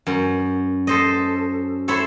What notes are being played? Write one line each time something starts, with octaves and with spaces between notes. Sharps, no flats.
F#2
A4 C5 D#5
E4 A4 C5 C#5 E5